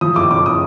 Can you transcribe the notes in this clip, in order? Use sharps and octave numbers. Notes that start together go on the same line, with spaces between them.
F3 D#6
F#1 D6
C#3 D6
D#6